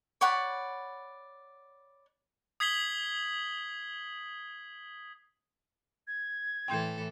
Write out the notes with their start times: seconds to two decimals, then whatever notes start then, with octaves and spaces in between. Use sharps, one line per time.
0.21 C#5 D5 F#5 B5
2.60 D#6 G#6 B6 C7 F#7 G7
6.07 G#6
6.68 A2 E3 A4 G5 C6 G6